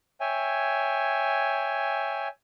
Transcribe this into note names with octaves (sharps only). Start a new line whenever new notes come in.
C#5 E5 G5 G#5